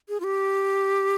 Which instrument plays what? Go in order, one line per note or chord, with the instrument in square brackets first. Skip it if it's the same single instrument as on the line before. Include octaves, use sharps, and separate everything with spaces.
[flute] G#4
F4
G4